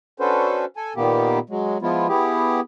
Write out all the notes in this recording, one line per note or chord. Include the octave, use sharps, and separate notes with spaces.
C#4 D4 F#4 A4 B4 C5
A4 G#5
A#2 D#3 A#3 B3 G4
F#3 G#3
F3 G#3 B3 E4 F4
B3 E4 G4 G#4